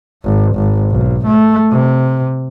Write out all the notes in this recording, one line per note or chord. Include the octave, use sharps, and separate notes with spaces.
G#1
G#1
B1
A3
C3